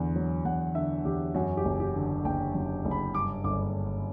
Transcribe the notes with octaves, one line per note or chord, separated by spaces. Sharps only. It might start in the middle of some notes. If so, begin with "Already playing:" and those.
Already playing: E2 D3
F#3
E2 F#5
D3 E5
E2 G4
F#2 F#4
G4
F#1
G4
D3
F#1 G5
F#2
F#1
B5
G2 D6
G1 D6